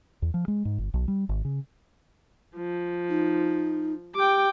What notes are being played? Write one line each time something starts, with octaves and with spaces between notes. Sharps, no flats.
E2
F3
G#3
G#2
G1
B1
G3
G#1
C#3
F3
D#4
G4 G5 D6